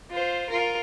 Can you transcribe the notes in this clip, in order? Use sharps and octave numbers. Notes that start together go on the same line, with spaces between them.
F4 C5
F4 A#4